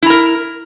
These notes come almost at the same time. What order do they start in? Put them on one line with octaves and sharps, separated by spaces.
E4 A#5 A#4